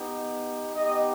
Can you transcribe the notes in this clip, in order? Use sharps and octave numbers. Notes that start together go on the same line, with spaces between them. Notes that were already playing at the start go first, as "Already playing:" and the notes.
Already playing: B3 D#4 G4
B3 D#4 G4 D#5